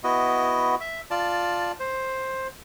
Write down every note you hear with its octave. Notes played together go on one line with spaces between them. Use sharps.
B3 E4 F#4 D#5
E5
F4 D5 A5
C5